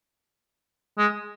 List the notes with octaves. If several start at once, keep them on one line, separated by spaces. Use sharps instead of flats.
G#3